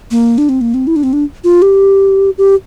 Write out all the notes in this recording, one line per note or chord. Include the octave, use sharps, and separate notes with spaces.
A#3
D4
C4
A#3
C4
E4
D4
C4
D4
F4
G4
G4